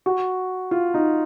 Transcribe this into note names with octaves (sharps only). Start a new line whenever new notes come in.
F#4
F4
D#4